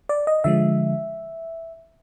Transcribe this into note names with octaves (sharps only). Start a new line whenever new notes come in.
D5
D#5
D3 F3 G#3 E5